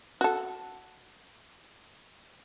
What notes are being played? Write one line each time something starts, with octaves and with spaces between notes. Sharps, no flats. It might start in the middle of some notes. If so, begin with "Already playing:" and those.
F#4 A4